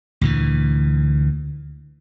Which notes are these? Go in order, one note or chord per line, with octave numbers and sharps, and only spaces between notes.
D2 A#2 E3